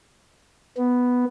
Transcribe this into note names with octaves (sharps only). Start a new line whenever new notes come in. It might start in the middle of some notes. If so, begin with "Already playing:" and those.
B3